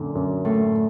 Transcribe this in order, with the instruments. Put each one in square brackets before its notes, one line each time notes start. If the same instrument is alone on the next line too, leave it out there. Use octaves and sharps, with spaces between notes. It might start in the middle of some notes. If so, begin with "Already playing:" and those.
Already playing: [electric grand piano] F#2 D3 [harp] A#2
[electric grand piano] F#2
[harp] A2 [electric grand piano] A3